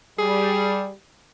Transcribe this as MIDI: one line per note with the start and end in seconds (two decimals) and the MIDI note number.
0.19 0.92 55
0.19 0.89 68